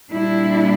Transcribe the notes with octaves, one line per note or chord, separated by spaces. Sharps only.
A#2 G3 D4 E4